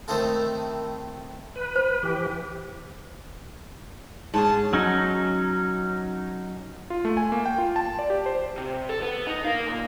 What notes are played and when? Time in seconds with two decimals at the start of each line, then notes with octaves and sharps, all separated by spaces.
0.08 D#3 A3 C4 D#4 E4 A4
1.56 B4
1.76 C5
2.03 E3 G4
4.34 G#2 C#4 G#4 A5
4.72 F#3 C#4 D#4
6.90 F4
7.05 A3
7.17 G#5
7.32 A#3
7.46 G5
7.58 F4
7.76 A5
7.99 D5
8.10 G4
8.26 C5
8.58 C3
8.89 A4
9.02 B3
9.27 D#4
9.45 A#4 F5
9.67 A#2